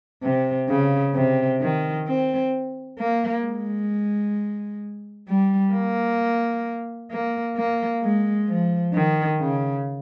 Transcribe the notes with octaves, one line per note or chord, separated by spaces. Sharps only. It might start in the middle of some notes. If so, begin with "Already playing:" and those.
C3
C#3
C3
D#3
C4
A#3
G#3
G3
A#3
A#3
A#3
G#3
F3
D#3
C#3